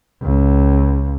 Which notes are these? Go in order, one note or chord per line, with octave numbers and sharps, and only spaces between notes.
C#2